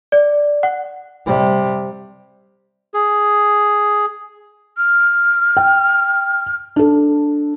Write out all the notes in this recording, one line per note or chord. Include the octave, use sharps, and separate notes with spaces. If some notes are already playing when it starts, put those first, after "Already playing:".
D5
F#5
C3 G3
G#4
F6
G5
D4 A4